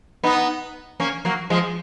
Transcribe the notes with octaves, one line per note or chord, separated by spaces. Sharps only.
B3 D#4
A#3 C#4
F#3 A#3
F3 G#3